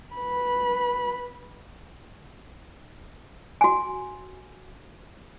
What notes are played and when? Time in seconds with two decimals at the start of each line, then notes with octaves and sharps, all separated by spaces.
0.15 B4 B5
3.61 F#4 G#5